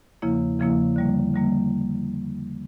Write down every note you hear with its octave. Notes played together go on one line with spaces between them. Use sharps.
E2 C#3 F3 A#3 E4
E2 C#3 F3 A#3 E4
D3 G3 A#3
D3 G3 A#3